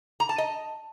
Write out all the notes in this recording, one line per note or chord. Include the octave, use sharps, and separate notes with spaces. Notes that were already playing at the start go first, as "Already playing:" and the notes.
A#5
A5
D#5